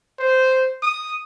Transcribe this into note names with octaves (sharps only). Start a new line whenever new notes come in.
C5
D#6